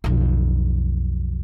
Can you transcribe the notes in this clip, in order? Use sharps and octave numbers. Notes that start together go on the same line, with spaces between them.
B1 F2